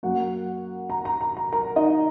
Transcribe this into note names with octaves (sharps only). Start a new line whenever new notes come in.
F#2 F#3 A#3 F#4 F#5
A#5
A#5
A#5
A#5
A#4 A#5
D#4 D#5